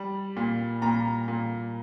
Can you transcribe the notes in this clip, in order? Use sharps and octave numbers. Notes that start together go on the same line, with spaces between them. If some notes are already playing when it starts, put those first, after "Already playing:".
Already playing: G3
A#2
A#2 A#5
A#2